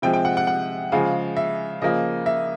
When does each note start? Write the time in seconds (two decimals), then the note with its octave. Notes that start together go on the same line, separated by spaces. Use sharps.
0.02 C3 F3 G#3 G5
0.13 G5
0.25 F#5
0.37 F#5
0.47 F#5
0.92 C#3 F3 G#3 F5
1.37 E5
1.82 C#3 F3 A#3 D#5
2.26 E5